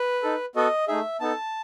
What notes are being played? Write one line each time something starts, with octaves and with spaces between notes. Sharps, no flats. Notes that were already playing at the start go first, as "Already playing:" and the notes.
Already playing: B4
D#4 A4
B3 F#4 A4 D#5
A3 D#4 G#4 E5
B3 D#4 A4 A5